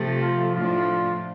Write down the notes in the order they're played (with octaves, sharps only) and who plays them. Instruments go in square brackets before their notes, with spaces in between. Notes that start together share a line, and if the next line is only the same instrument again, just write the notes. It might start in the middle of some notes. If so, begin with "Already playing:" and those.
Already playing: [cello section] C3 F3 A3
[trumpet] F4
[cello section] A2 F3 A3 D4 [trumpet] F4